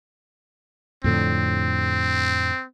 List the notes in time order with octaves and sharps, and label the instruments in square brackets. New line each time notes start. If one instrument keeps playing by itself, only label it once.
[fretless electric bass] F2 A2 D3 [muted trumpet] C4